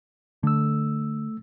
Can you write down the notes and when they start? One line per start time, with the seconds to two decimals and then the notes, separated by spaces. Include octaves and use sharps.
0.43 D3 A3 E6